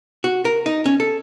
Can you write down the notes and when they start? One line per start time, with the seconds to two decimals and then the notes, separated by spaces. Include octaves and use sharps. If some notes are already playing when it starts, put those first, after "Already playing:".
0.24 F#4
0.45 A#4
0.66 D#4
0.86 C#4
1.00 A4